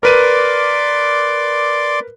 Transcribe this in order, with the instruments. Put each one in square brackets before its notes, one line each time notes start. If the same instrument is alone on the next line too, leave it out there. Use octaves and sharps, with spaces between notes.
[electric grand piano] A#4 B4 D#7 [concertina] D5 C6 D6